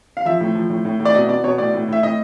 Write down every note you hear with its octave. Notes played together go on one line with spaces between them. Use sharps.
F5
F3 E5
A2
F3
A2
A2
A2
D5
B2 D#5
B2 D5
B2 C#5
A2 D5
A2
A2 E5
A2 D#5